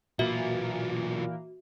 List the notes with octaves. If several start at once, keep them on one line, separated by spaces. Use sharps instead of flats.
B1 A#2 E3 A#3 F4 F#4 E5